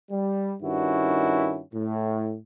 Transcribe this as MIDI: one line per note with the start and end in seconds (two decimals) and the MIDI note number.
0.11 0.54 55
0.62 1.61 43
0.62 1.61 51
0.62 1.61 61
0.62 1.61 64
0.62 1.61 66
1.73 2.36 45